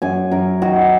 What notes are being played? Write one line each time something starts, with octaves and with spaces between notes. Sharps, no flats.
F#2 G#5
F#2 A#4
D#3 F#4